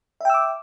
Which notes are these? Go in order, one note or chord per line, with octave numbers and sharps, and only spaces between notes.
E5 G5 D6 E6